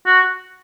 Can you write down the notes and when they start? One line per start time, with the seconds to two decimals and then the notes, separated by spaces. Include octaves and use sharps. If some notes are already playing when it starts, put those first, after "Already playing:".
0.06 F#4